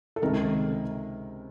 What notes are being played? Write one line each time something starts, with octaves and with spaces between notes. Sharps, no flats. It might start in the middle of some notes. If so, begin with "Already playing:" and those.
A4
C#2 C3 D#3 A#4